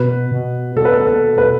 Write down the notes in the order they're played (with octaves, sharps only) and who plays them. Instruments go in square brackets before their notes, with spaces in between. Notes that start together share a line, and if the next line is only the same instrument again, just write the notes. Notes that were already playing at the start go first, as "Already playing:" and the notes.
Already playing: [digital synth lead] B2 [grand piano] B4
[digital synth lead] B2
[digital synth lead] B2 [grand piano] A4
[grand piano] B4
A4
A4
B4